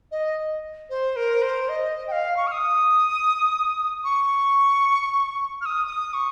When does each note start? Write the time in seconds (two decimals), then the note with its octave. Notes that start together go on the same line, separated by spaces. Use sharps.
0.11 D#5
0.90 C5
1.16 A#4
1.42 C5
1.69 D#5
2.08 G5
2.12 F5
2.36 C#6
2.47 F6
2.52 D#6
4.04 C#6
5.61 F6
5.65 D#6
5.87 D#6
6.14 C#6